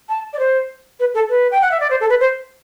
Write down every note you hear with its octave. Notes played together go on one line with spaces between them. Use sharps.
A5
D5
C5
B4
A4
B4
G5
F#5
E5
D5
C5
A4
B4
C5